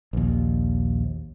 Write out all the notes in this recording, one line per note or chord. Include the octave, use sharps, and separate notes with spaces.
A#1 D#2